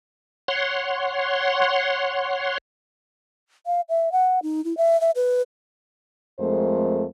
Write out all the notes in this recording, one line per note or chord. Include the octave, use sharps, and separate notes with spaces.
C#5 F#5 C6
F5
E5
F#5
D#4
E4
E5
E5
B4
F2 G#3 A3 C4 A#4 C5